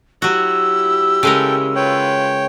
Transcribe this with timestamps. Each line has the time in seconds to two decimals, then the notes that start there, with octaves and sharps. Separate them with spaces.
0.22 F#3 E4 F#4 G4 E6
1.23 C#3 G#3 A4 A#4 G5
1.75 F4 B4 C#5 G5